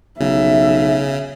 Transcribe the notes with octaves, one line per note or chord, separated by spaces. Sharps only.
B1 C#3 E5